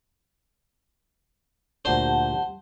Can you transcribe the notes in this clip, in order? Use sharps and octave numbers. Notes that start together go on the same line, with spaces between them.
D2 A#2 D4 G4 C5 F#5 A5